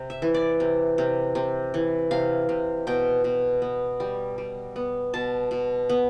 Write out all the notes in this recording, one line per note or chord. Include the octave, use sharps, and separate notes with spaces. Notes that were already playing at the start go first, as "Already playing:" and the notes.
Already playing: C3
E5
E3
D5
C3
C3
C3
E3
C3 F5
C3
B2 G5
B2
B3
G3
G3
B3
B2 A5
B2
B3